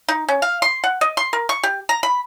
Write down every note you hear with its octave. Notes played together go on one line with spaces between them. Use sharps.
D#4
C#4
F5
C6
F#5
D#5
C6
A#4
C#6
G4
A#5
B5